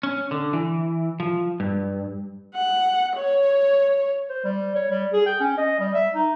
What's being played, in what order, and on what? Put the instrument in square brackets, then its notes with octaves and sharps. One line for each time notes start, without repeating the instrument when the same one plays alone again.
[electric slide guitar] C#4
D3
E3
F3
G2
[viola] F#5
C#5
[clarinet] C5
G3
C#5
G3
G#4
G5
C#4
D#5
G3
E5
D#4